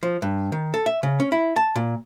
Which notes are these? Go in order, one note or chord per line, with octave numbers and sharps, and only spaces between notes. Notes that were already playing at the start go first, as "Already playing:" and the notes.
F3
G2
D#3
A4
E5
C#3
C#4
E4
A5
A#2